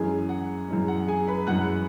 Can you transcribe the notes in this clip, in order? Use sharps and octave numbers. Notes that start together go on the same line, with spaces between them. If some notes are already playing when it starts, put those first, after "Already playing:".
Already playing: F#2 E3 G#3 C#4 G#4 G#5
F#5
F#2 E3 G#3 C#4
F#5
G#4 G#5
B4 B5
F#2 E3 G#3 C#4 F#5 F#6